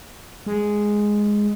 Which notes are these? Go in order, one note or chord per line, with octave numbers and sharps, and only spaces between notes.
G#3